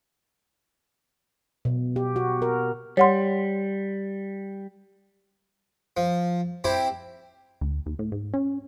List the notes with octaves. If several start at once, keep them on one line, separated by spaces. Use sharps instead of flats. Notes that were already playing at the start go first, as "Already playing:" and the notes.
B2
G4
F#4
A#4
G3 C#5 F#5 C6
F3
C4 E4 G4
D2
D#2
A2
G#2
C#4